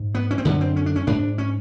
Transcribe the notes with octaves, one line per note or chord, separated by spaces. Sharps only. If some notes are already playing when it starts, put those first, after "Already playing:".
Already playing: G#2
B3
C#4
C4
F#2 D3 B3
C4
C#4
D4
C#4
G#2 D4
C#4